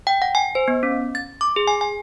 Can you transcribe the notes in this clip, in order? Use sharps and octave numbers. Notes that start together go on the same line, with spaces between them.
G5
F#5
G#5
C5
B3
C#4
A6
D6
G#4
G#5
G#5